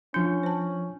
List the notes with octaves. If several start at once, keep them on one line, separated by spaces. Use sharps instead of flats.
F3 C#4 D4 G6
C5 A5